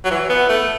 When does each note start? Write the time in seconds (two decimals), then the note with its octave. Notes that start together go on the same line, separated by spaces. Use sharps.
0.05 F#3
0.11 E3
0.30 B3
0.49 A3